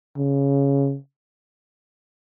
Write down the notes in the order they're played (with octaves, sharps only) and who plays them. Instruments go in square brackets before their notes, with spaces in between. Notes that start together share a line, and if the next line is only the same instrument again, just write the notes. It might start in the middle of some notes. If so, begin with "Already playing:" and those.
[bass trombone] C#3